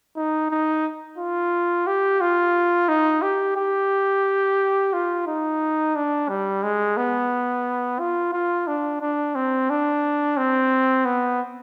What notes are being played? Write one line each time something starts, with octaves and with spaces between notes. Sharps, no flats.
D#4
D#4
F4
G4
F4
D#4
G4
G4
F4
D#4
D4
G3
G#3
B3
F4
F4
D4
D4
C4
D4
C4
B3